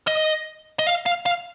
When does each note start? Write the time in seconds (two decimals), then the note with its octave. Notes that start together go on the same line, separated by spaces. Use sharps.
0.07 D#5
0.79 D#5
0.87 F5
1.06 F5
1.26 F5